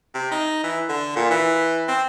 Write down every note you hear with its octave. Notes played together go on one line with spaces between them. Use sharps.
C3
D#4
E3
D3
A#2
E3
C4